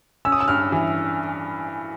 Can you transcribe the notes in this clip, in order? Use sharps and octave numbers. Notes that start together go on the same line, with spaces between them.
C#4 E6
D#6
E6
G2 F6
E3